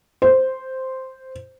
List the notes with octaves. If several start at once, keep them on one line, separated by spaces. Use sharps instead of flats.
C5